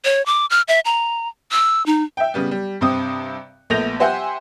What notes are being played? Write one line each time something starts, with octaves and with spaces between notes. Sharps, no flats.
C#5
D6
F6
E5
A#5
E6
D#4
E5 G5
C#3 G3 B3
G3
G2 C3 C4 D#6
A#1 A3 B3 G6 A#6 F7
G4 C5 E5 F#5 G#5 G6